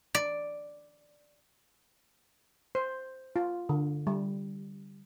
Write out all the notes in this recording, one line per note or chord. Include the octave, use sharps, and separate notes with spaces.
D5
C5
F4
D3
G3